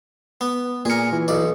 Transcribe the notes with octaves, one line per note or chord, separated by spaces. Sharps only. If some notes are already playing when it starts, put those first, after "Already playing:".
B3
A#2 G#4 A#4 C#7
E3
B1 D5